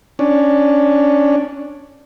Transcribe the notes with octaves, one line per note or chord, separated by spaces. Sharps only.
C#4 D4